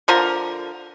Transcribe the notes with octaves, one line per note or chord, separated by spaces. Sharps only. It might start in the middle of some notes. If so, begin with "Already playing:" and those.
D3 F3 A#4